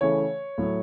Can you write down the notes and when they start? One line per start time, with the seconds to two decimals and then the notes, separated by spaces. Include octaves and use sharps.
0.01 C#3 E3 A3 C#5
0.58 A2 F#3 A3